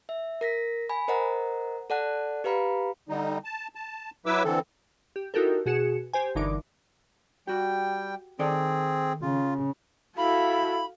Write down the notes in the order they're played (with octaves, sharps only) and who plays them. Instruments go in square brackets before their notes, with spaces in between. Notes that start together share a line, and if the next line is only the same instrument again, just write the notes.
[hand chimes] E5
A#4 A#6 B6
G#5 B5
A#4 C5 D#5 F#5 A#5
A4 D5 F#5 A5 F#6
G4 B4 F5 A#5 B5
[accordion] D3 G3 D#4
A5
A5
F#3 E4 B4 E5 D6 E6
D3 E3 C4 A4
[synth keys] G4
D#4 E4 F#4 G4 A4 A#4
B2 F#4 G#4 C#7 E7
G4 C5 G#5
G1 D3 E3 D#4 A#4 D6
[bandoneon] G3 G5 [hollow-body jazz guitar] F#4 G4
[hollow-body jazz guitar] D#3 A4 D5 [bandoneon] C4 G#4
[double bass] C#3 [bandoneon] F4
[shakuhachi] E4 [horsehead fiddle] F#4 A4 [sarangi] F5 [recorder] B5